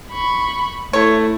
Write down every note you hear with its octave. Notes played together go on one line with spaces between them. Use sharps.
B5 C#6
A3 E4 C#5